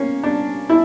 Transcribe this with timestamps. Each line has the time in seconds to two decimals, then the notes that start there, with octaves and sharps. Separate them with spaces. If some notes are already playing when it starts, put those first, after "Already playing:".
Already playing: A#3 C#4
0.24 D4
0.69 E4